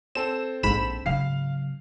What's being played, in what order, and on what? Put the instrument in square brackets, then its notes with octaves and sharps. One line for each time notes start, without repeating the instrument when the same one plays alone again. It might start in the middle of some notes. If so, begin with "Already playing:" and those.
[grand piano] C4 A4 [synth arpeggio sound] E7
[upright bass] A#1 [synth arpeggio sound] G#2 B5 E7
[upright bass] C#3 F#3 [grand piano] F5 C7